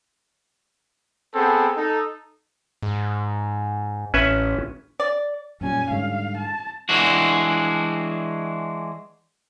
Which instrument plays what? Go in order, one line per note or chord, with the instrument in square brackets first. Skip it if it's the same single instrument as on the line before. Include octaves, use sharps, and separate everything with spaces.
[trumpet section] B3 C4 G#4 A4
D#4 A4
[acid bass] G#2
[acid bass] A1 [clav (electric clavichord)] C#4 B4 E5
[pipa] D5
[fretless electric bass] F#2 A#2 G3 [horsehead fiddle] C#4 G#5
[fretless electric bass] G#2 D3 G3 [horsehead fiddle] F5
[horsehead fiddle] A5
[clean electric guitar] E3 G#3 D4 F#4